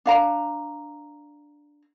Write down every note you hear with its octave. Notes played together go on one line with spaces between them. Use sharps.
D4 F5 A#5